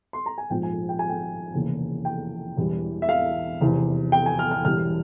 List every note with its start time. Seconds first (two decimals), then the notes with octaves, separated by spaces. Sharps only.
0.13 C6
0.26 A#5
0.38 G#5
0.50 A#1 G#2 F3 G5
0.63 G#5
0.89 G5
0.99 G#5
1.09 G5
1.54 F1 E2 C#3 E3 A#3
2.05 G5
2.57 E1 E2 E3 G3
3.02 E5
3.09 F5
3.61 F1 E2 C3
4.12 G5
4.26 G#5
4.39 F6
4.51 F6
4.65 E1 E2 E3 G3 F6